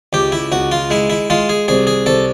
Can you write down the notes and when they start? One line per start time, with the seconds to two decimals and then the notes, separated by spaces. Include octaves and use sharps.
0.13 C#2 G4
0.32 E4
0.52 C#2 F#4
0.72 F4
0.90 G#3 E4
1.10 E4
1.30 G#3 F4
1.49 G#4
1.68 C2 G#4
1.87 G#4
2.06 C2 A4